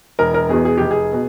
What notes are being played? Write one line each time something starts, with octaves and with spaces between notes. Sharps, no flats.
E1 A#4
A#4
E2 B2 G#4
G#4
F1 G4
G#4
B2